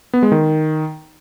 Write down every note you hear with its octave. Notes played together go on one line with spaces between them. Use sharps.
B3
G#3
D#3